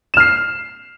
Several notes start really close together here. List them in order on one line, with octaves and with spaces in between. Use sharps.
E7 F6 C7